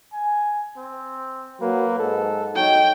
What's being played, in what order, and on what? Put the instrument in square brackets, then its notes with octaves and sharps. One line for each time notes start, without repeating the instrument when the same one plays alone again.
[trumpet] G#5
C4
[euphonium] F#3 [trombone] A#3 [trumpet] B4
[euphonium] G#2 [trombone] A4
[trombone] F#3 [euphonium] D#4 [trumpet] C#5 [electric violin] G5